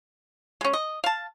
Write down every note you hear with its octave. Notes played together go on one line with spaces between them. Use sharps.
G#3 C#4
D#5
F5 A5